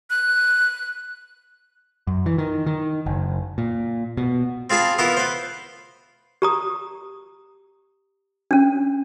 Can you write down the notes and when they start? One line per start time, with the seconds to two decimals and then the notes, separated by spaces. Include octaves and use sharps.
0.10 F#6
2.07 F#2
2.26 E3
2.38 D#3
2.66 D#3
3.06 F#1
3.58 A#2
4.17 B2
4.70 C4 F4 G#4 A5 B5
4.99 B3 E4 F4 A#4 E5
5.17 B4 C5
6.42 G4 A#5 D#6
8.51 C#4 D4